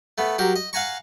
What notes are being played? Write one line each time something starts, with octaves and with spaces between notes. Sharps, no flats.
A3 B3
F#3 G4 A#4
D#5
F5 F#5 G#5 A#5 C#6